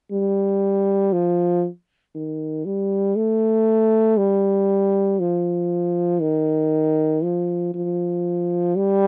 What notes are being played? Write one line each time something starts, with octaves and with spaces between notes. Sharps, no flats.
G3
F3
D#3
G3
A3
G3
F3
D#3
F3
F3
G3